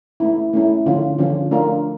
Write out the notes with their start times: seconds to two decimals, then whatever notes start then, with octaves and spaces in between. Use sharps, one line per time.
0.20 A3 C#4 E4
0.53 A3 C#4 E4
0.86 D3 F3 C#4 F4 A4
1.18 D3 F3 C#4 F4 A4
1.51 A3 D4 F4 A#4 C#5